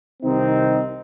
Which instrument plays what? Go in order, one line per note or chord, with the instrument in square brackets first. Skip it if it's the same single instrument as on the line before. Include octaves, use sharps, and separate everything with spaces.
[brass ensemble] C2 C3 D#3 C4 D#4